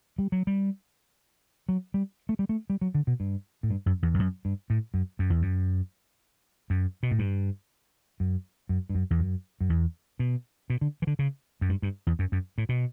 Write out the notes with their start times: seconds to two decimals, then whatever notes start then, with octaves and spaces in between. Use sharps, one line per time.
0.18 G3
0.32 F#3
0.47 G3
1.69 F#3
1.94 G3
2.29 A3
2.39 G3
2.49 A3
2.70 G3
2.81 F#3
2.95 D3
3.07 B2
3.20 G2
3.63 A2
3.70 G2
3.86 F#2
4.02 E2
4.14 E2
4.19 F#2
4.45 G2
4.70 A2
4.94 F#2
5.19 F#2
5.30 E2
5.42 F#2
6.70 F#2
7.03 B2
7.11 A2
7.19 G2
8.20 F#2
8.69 F#2
8.89 G2
8.95 F#2
9.10 E2
9.19 F#2
9.61 F#2
9.70 E2
10.19 B2
10.70 B2
10.81 D3
11.02 E3
11.07 D3
11.19 C#3
11.61 F#2
11.69 G2
11.82 G2
12.07 E2
12.19 F#2
12.32 F#2
12.58 A2
12.69 B2